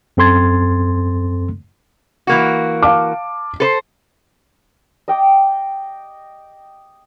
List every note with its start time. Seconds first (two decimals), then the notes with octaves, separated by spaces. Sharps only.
0.17 F#2 C4 A4 C6 G#6 A6
2.27 E3 A#3 F#4
2.83 F5 A5 D6
3.60 A4 B4 C5
5.08 D#5 G5 D6